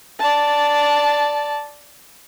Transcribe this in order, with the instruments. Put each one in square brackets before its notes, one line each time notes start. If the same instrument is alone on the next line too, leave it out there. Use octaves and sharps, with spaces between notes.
[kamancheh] D5 A5